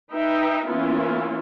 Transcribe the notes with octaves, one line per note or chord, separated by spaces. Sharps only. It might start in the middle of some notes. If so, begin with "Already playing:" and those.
D#4 B4 E5 G5
E3 A#3 B3 C#4 E4 F4